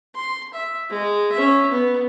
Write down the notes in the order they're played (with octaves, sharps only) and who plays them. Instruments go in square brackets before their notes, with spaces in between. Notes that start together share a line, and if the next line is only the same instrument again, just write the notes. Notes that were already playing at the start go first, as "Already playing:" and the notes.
[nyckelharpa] C6
E5
G#3
C#4 E5
B3